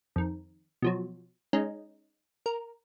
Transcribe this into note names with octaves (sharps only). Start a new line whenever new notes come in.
F2 D#3
B2 F3 F#3
G#3 C#4 D#4
A#4